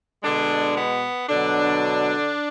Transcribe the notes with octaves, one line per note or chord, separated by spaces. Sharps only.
B2 D3 G#3 D4
B3
B2 D3 F#3 D4